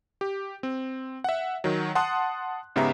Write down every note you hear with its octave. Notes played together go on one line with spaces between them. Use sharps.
G4
C4
E5 F#5
D#3 F#3
F#5 A5 C6 D#6 F#6
G#2 C#3 B3 G4 E5 A#5